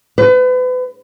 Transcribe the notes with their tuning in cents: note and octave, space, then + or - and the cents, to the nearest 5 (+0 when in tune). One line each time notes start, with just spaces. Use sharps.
B4 +35